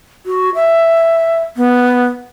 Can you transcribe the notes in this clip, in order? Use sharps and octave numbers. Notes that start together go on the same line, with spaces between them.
F#4
E5
B3